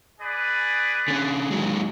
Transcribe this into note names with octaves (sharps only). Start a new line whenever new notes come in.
G#4 B4 D5
D3 C#4
D#3 F#3 G#3